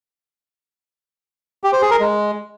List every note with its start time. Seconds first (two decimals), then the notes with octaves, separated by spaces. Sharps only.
1.64 G4
1.73 C5
1.82 G#4
1.91 A#4
2.00 G#3